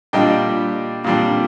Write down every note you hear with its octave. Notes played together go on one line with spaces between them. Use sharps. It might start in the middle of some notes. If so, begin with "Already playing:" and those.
A#2 G3 D4 D#5 G5
A#2 G3 D4